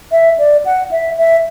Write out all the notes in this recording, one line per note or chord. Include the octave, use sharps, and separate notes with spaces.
E5
D5
F#5
E5
E5